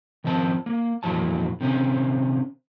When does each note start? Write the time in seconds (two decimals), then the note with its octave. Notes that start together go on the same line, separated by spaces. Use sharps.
0.24 D#3 F3 C4 A5
0.66 A#3
1.03 F2 A#2 E3 F#3 A5
1.61 C3 D#3 C4 C#4